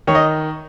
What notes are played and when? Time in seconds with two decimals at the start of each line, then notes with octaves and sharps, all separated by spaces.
0.07 D#3 C#5
0.15 D#5